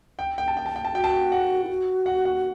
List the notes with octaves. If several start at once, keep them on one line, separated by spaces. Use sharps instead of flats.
G5
G5
A5
G5
A5
G5
A5
F#4 G5
A5
G5
F#5
E4
F#4
F#5
F#5